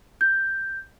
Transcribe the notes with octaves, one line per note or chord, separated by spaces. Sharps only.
G6